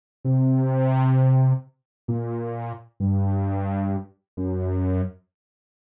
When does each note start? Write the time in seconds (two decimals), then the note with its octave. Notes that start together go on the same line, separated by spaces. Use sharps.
0.25 C3
2.08 A#2
3.00 G2
4.37 F#2